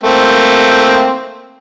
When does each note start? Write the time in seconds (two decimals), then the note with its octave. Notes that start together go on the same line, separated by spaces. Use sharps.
0.03 A3 A#3 C4